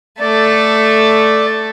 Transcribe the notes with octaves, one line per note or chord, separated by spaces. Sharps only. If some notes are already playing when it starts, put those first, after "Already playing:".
A3 A4 D5